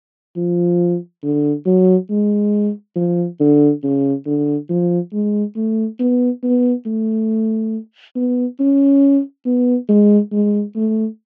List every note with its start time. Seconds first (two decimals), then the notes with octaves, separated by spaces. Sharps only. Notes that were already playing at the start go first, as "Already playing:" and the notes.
0.36 F3
1.23 D3
1.66 F#3
2.10 G#3
2.96 F3
3.40 D3
3.84 C#3
4.26 D3
4.69 F3
5.13 G#3
5.56 A3
6.00 B3
6.43 B3
6.86 A3
8.16 B3
8.60 C#4
9.46 B3
9.89 G#3
10.32 G#3
10.76 A3